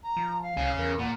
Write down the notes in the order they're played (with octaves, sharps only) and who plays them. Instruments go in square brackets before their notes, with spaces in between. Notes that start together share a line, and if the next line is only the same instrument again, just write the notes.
[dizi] A#5
[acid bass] F3
[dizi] F5
[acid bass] C2 [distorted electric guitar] C#4 G#4
[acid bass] E2 [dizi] A#4
[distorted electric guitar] A#2 [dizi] F#5